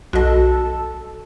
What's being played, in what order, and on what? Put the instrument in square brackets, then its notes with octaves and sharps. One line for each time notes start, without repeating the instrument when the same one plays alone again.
[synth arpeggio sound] B1 D#5 [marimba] F#4 [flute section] A4 A5